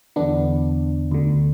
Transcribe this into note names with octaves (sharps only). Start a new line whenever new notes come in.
E2 D3 B3 D4
D2 D3